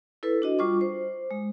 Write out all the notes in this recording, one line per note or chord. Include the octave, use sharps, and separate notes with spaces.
E4 A4 B4
D4 F#4 D#5
G3 F4 C#6 D6
C5
G#3